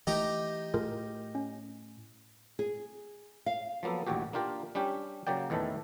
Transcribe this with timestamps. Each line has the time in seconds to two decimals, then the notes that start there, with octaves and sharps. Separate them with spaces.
0.07 E3 A3 D#4 G4 A#5
0.74 A2 F4 G#4 A#4
1.35 C#4
2.59 G#4
3.46 F5
3.83 F3 F#3 A#3 B3 A4
4.07 A1 D#2 A#2 F#4 G4
4.33 A#3 D4 F4 G4 A#4
4.75 G3 C#4 D4 G4
5.27 C#3 F#3 A#3 D5 G5
5.50 E2 A2 D#3 E3 A4